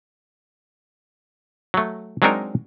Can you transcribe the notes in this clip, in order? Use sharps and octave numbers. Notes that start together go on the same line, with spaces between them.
F#3 A3
F#3 G#3 C4 D4 D#4 A#4